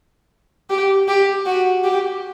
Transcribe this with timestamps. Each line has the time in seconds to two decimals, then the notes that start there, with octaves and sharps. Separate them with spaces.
0.70 G4
1.08 G4
1.46 F#4
1.85 G4